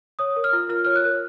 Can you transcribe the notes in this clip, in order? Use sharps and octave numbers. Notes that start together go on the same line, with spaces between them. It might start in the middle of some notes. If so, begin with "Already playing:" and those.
C#5 D#6
A#4
F6
F4
F4 F6
C#5 F6
F#6
A#4